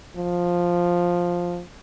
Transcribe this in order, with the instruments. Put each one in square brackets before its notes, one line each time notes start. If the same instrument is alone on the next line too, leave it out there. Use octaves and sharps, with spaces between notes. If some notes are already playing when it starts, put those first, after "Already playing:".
[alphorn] F3